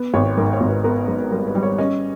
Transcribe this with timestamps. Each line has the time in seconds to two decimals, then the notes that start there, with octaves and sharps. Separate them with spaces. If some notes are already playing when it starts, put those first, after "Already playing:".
Already playing: B3
0.14 G#1 C#5
0.37 G#2 A#4
0.53 C#5
0.61 G#1
0.69 B4
0.84 B3 A#4
1.08 G#2 B4
1.31 G3 A#4
1.47 B4
1.55 G3
1.63 C#5
1.78 C#4 D#5